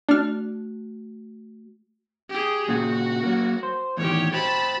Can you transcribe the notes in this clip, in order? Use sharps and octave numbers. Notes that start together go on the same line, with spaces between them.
A3 D4 F#4 F6
G4 G#4
A#2 C#3 F#4 G4
F#3 A#3
C5
E2 A2 D#3 G4 C#5
F#4 C5 G5 A5 B5